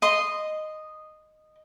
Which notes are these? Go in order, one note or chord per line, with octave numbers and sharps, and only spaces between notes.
D#5 C6